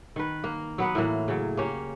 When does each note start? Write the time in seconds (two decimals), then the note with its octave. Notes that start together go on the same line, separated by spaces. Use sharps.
0.16 D#3 B4
0.44 A#3
0.78 F#3 B3 B4
0.95 A2 E3 A#3
1.28 C#3 F#3
1.57 A#3 C#4 G4